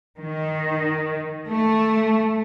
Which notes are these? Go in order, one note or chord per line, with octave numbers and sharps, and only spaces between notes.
D#3
A3